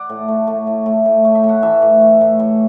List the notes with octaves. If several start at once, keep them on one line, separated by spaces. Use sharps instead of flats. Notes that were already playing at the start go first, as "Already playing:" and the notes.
Already playing: D5 F#5
A2
A3
A3
A2
A2
A2
A3
E5
A2 F#5
E3 E5 A5
A2
A3
A2
A2